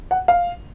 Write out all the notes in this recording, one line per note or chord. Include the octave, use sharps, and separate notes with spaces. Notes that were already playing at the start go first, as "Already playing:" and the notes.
F#5
F5